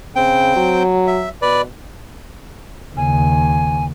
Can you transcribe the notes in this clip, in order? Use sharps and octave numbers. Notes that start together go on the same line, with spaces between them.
C#3 C4 G5
F#3
E5
B2 B4 D5
D#2 C#3 G#5